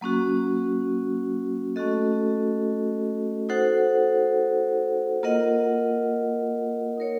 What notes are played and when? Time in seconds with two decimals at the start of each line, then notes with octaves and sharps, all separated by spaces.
0.01 F#3 A#3 C#4 F#4
1.76 A3 C#4 F#4 A4 D#5
3.49 D#4 F#4 A4 C5 F#5
5.23 A#3 F4 A#4 D#5 F#5
6.97 D#4 A#4 C#5